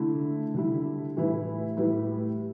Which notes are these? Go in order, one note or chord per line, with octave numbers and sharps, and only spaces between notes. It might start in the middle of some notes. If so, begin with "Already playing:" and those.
Already playing: D3 A3 E4
D3 G3 E4
A2 E3 G3 E4 B4
A2 G3 E4 B4